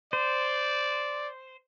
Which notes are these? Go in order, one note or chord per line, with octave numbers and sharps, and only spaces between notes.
C5 D5